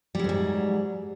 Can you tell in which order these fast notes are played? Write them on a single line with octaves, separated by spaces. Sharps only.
G3 F#3 F2 G#2